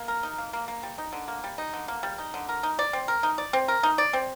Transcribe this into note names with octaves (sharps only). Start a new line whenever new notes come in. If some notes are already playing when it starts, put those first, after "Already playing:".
Already playing: A#3
A#4
D#4
A#3
A#3
A#3
G3
D#4
D3
A#3
G3
D#4
D3
A#3
G3
D#4
D3
A#4
D#4
D5
C4
A#4
D#4
D5
C4
A#4
D#4
D5
C4